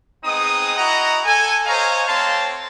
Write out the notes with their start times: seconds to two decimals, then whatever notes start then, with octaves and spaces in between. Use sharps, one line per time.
0.24 G#3 B3 C4 D#4 D#6
0.77 E4 F#4 D#5 F#5 A#5
1.24 A4 G#5
1.66 C5 C#5 D#5 F5 G#5 A#5
2.07 A3 C4 C#5 F5 A5 C6